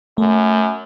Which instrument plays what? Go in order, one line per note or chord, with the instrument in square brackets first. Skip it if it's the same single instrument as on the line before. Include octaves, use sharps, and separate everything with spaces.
[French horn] F#2 [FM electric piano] A3